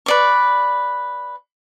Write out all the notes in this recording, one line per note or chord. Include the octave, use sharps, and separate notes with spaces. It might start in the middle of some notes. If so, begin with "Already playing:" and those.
B4 D5 C#6